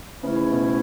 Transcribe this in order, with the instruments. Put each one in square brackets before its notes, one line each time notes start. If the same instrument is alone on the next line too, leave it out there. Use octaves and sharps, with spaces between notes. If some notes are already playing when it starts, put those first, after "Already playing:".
[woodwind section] G#2 E3 A3 C#4 E4 [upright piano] C#3
[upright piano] B2